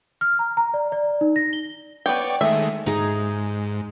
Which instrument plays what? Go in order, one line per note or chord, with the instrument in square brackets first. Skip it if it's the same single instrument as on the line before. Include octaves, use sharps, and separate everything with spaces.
[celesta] F6
A#5
A#5
D5
D5
D#4
A#6
G7
[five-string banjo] B3 G5 [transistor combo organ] C#5 D5
[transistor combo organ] D#3 G#3 A3 [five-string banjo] E5
[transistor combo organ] G#2 [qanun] D#4 G#4